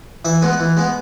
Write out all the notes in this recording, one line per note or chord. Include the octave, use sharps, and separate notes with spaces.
E3 E5
G#3 B3 B4
E3
G#3 B3